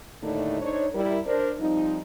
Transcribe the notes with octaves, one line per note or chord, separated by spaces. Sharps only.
D#2 A2 D3 A3 D4 D#4
D4 D#4 A4 C5 C#5
G3 E4 A#4
D4 A#4 C5
F3 G3 C4 D#4